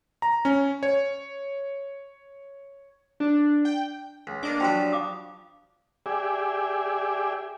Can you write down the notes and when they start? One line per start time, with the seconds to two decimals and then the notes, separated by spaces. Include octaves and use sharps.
0.22 A#5
0.45 C#4
0.83 C#5
3.20 D4
3.65 G5
4.27 C#2
4.43 A#3 D4 D#5 D6
4.60 F3 F#3 F4 G4 G5
4.92 F5 D6 D#6
6.06 G4 G#4 D5 E5